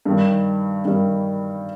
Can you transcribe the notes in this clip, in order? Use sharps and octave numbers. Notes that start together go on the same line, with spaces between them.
G2 D#3 G3
G2 D#3 G3